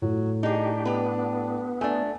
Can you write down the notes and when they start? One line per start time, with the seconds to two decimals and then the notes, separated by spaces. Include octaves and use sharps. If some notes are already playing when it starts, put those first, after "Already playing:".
0.02 A2 F#3
0.43 D4 D#4 G4 G#4
0.85 B3 G4 B4
1.81 A3 D4 G#5